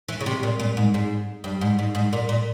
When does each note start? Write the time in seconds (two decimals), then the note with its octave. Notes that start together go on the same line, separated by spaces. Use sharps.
0.09 E3
0.21 C#3
0.26 C3
0.43 A#2
0.60 A#2
0.77 G#2
0.94 G#2
1.44 G2
1.61 G#2
1.79 G#2
1.95 G#2
2.13 A#2
2.29 A#2